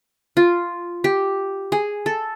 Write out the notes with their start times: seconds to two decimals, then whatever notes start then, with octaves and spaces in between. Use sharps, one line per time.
0.37 F4
1.04 G4
1.72 G#4
2.06 A4